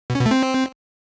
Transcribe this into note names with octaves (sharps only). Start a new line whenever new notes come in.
B2
C#4
B2
A3
C4